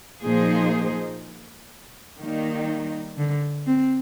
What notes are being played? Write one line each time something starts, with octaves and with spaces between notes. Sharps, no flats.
A#2 F3 A#3 D#4 G#4 C5
D#3 G3 A#3 D#4
D3
C4